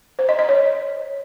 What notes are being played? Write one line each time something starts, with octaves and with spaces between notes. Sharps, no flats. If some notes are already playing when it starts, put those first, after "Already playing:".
C5
D#5
D#5
C#5